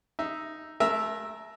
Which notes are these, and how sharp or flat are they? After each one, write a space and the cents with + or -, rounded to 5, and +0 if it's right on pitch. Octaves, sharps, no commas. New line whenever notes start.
D#4 +0 E5 +0
A3 -35 A#4 +0 E5 +0